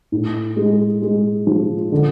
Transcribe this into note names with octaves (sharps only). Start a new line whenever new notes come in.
A2
G#3
G#3
F3
D3